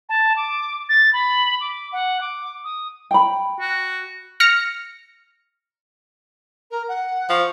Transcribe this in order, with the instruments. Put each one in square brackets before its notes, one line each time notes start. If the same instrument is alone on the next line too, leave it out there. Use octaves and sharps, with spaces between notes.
[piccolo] A5
D6
A6
B5
D6
F#5
D6
D#6
[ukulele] G5 B5
[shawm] F#4
[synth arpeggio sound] F6 A#6 C#7
[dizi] A#4
F#5
[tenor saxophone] F3 [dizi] C#6